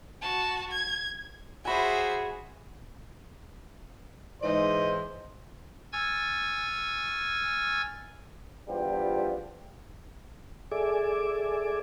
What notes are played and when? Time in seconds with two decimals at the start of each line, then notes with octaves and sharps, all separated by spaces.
0.22 F#4 A5
0.72 G#6
1.65 F#4 G#4 C5 E5 G#5 B5
4.42 G#2 E3 C5 D#5
5.92 G#5 C#6 E6 F6 G#6 A6
8.68 E2 F3 G3 D4 F4 G4
10.71 G#4 A4 D5 E5 G#5 D6